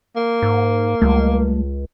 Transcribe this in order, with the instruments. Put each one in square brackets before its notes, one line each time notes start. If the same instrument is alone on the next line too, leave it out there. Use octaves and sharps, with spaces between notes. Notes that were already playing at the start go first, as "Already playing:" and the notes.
[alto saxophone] A#3
[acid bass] G#2
[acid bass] C#2 [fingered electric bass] G3 A3